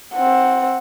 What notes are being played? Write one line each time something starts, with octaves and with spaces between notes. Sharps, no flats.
C4 F#5